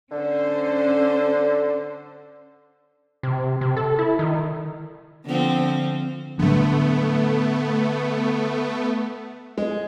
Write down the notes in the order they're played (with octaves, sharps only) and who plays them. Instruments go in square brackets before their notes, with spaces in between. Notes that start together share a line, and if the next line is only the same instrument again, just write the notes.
[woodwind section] D3 [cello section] C#4 C5
[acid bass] C3
C3
A4
E4
D#3
[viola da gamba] D3 F3 C4
[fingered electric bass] A2 F#3 G3 [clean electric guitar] D3 [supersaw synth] A3 B3
[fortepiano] G#3